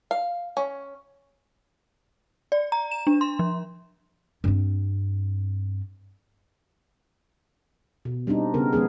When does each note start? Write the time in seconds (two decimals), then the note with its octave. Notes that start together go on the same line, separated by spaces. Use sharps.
0.11 F5
0.57 C#4
2.52 D5
2.72 A#5
2.91 E7
3.07 D4
3.21 C6
3.39 F3
4.44 G2 C4
8.05 B2
8.27 G3 C4 D4 D#4
8.54 C#3 B3 A#4
8.73 F3 G#3 B3 G#4